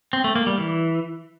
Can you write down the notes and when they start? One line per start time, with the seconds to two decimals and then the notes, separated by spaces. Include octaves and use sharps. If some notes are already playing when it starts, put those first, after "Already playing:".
0.13 C4
0.24 A3
0.35 A#3
0.47 G3
0.58 E3